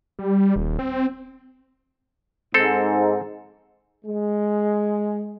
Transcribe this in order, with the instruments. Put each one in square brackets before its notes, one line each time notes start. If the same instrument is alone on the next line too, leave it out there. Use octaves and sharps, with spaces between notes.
[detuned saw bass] G3
D#1
C4
[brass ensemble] G#2 [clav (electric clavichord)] C4 A4
[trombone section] G#3